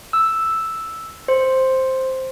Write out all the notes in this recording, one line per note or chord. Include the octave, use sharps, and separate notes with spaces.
E6
C5